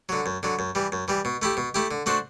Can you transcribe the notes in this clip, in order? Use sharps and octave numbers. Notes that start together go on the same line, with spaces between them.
D3 F#3
F#2
D3 F#3
F#2
E3 G3
F#2
E3 G3
B2
A3 E4 G4
B2
A3 E4 G4
D3
A3 D4 F#4 C5